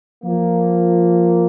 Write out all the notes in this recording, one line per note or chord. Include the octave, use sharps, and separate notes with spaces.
F3 A#3